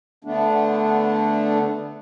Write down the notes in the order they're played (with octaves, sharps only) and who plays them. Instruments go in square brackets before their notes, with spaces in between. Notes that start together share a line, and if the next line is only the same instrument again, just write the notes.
[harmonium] D3 A3 B3 D4